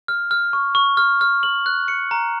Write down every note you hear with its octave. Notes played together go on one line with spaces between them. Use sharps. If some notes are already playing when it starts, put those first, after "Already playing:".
F6
F6
C#6
C#6
F6
F6
F#7
F#6
C#7
A#5